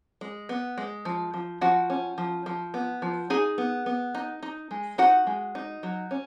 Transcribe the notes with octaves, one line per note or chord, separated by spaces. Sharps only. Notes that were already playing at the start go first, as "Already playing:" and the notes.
G#3
B3
G#3
F3
F3
F3 F#4 F#5
C#4
F3
F3
B3
F3
D#4 G#4 G#5
B3
B3
D#4
D#4
G#3
D#4 F#4 F#5
G#3
D#4
F#3
C#4